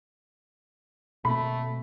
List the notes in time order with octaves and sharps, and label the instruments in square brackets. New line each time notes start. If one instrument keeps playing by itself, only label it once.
[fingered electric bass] B2 A#3 C4 [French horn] A3 [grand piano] B5